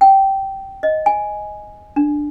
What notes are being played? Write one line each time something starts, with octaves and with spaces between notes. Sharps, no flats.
G5
D#5
G#5
D4